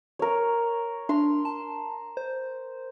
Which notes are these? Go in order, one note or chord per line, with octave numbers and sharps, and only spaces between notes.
A#4 C#5
D4 A#5 C6
A5
C5